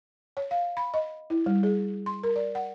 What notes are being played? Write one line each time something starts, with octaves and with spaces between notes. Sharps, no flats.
C#5
F5
B5
D#5
E4
G3
G#4
C6
A#4
D5
F#5